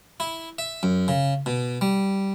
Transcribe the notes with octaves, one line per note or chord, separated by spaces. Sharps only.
E4
E5
F#2
C#3
B2
G3